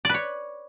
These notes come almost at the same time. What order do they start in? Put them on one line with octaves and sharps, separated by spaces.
D5 B4 C#5